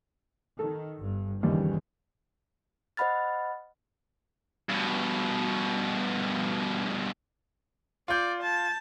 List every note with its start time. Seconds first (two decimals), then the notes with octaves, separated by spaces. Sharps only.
0.59 D#3 A4
1.00 G1 G2
1.43 G1 D#2 C#3 E3 G3
2.97 C5 D#5 F#5 B5 F6 A6
4.69 G2 B2
8.08 F4 D5 G6
8.42 A5